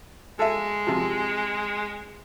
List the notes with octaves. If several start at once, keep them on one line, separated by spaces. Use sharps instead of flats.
G#3 A4 E5
C3 F3